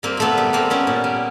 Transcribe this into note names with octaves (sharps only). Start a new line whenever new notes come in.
G3 A#3 C4
A#2 A3 B3
G3
G3 A#3 C4
G3 B3 C#4
A#2
G3